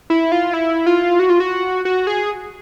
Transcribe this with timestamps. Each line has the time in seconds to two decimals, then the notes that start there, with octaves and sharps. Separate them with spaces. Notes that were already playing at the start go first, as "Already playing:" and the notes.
0.10 E4
0.32 F4
0.53 E4
0.86 F4
1.19 F#4
1.30 F4
1.40 F#4
1.85 F#4
2.07 G#4